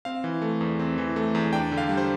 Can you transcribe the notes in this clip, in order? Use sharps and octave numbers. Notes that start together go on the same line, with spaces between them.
C4 F5
E3
A3
E2
C4
E3
A3
E2
D4 G5
D3
F5
G3
C5